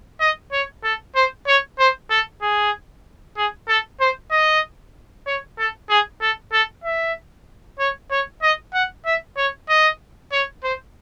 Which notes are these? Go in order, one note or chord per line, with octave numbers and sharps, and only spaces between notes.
D#5
C#5
A4
C5
C#5
C5
A4
G#4
G#4
A4
C5
D#5
C#5
A4
G#4
A4
A4
E5
C#5
C#5
D#5
F#5
E5
C#5
D#5
C#5
C5